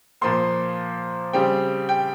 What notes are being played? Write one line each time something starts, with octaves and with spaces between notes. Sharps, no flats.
A#2 F3 A#3 C6
C#3 G3 C4 G5
G5